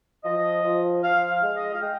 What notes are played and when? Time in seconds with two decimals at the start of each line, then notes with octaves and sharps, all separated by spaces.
0.24 F3 D#5
0.64 F3
1.02 F3 F5
1.29 F5
1.42 G#3
1.55 D#5
1.73 F5
1.81 G#3 G5